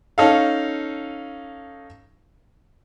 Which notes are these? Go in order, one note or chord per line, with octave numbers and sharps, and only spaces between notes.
C#4 D#4 A4 F5